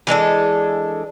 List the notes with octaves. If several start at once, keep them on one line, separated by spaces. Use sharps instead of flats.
E3 G#3 D4 A4